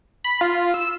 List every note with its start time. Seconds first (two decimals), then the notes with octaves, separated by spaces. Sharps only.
0.24 B5
0.41 F4
0.74 E6